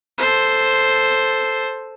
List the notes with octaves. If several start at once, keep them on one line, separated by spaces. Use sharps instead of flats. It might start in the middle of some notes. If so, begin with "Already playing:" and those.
A4 C5